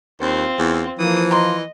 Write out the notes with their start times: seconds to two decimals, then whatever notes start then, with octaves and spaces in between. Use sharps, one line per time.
0.21 D#2 C4 F4
0.59 E2
0.99 E3 F3 A#3 D#6
1.31 A#4 D#5 C6